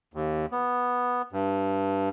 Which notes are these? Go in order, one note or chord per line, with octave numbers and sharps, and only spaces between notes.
D#2
B3
G2